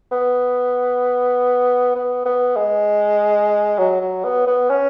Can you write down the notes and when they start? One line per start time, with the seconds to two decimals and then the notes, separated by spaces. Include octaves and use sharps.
0.12 B3
1.95 B3
2.26 B3
2.56 G#3
3.78 F#3
4.01 F#3
4.24 B3
4.47 B3
4.70 C#4